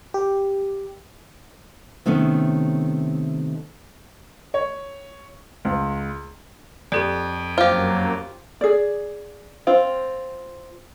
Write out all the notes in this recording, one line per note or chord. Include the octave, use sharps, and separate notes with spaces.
G4
C3 D#3 A3 B3 C#4
C#5
C#2
F2 G4 A4 D5
F#2 F#3 A#3 F4 G4 C5 F5
G#4 D5
C4 F4